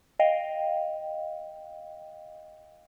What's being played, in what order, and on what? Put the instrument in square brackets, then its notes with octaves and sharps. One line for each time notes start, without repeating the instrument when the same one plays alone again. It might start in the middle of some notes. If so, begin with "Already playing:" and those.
[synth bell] D#5 F5 G5